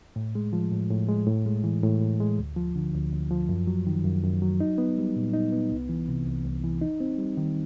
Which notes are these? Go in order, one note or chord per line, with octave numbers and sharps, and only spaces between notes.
A2
G#3
F3
A2
A2
G#3
A2
G#3
E3
A2
A2
G#3
D2
F3
D3
D2
D2
F3
F#2
F#3
D#3
F#2
F#2
F#3
D#4
B3
G3
A#2
D#4
B3
C2
E3
C3
C2
C2
E3
D#4
C4
G3
D#3